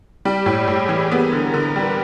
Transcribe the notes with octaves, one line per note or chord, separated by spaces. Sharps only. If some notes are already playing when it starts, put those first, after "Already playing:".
G3 G4
A2
A2 G#4
E3
B3 A#4
D3
D3 B4
G3